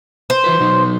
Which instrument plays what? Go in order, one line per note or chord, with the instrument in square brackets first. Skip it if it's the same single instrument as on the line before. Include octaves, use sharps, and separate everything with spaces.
[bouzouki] C5
[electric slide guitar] E3 F4 B4
B2 F#3 D#4